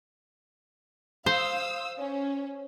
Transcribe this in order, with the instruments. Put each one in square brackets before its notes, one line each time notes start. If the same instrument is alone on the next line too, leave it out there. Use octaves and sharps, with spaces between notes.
[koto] C5 [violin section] F5 D#6 E6
[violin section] C#4